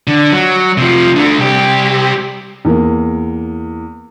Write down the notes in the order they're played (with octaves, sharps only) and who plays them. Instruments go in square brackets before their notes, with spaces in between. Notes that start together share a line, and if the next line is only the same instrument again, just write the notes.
[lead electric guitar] D3
F#3
C3 F3
D3 A3
C2 G4
[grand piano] E2 A#3